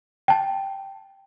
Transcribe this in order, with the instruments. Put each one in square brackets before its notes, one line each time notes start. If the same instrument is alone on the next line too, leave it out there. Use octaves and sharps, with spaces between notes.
[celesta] G5 A5